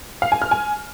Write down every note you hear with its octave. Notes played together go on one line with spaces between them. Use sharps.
F5
G#5
F6
G#5